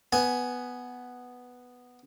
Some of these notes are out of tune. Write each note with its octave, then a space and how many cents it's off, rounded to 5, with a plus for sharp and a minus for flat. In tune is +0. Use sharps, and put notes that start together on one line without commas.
B3 +0 G#5 +10